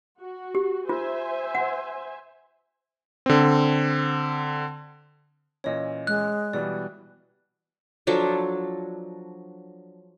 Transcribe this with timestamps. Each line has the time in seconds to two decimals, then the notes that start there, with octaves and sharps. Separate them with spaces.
0.20 F#4
0.55 G4
0.89 F4 C5 E5 G#5
1.55 F#5
3.26 D3 C4
5.64 A#2 E3 C#4 C#5 D#5
6.07 G#3 F#6
6.53 B2 E3 G3 D5
8.07 F3 F#3 D4 A4